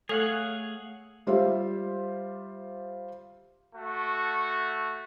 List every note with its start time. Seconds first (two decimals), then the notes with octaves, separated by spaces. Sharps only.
0.09 A3 G#4 A4 C#5 F5 F#5
1.27 G3 F4 G4 C5 E5
3.74 A3 F#4